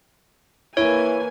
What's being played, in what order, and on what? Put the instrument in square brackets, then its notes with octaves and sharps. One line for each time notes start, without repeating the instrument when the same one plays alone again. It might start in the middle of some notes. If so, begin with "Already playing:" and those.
[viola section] E3 A#3 G#5 [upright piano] E4 [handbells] C#5